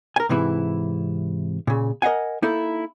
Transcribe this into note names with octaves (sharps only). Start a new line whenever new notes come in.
A#4 G#5
G#2 C3 E3 E4
A#2 C#3
A#4 D#5 F5 F#5 G#5
A#3 D#4 E4 A4